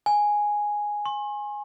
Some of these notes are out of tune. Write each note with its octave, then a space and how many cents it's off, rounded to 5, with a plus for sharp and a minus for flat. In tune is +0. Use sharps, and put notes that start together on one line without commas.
G#5 +0
C6 +45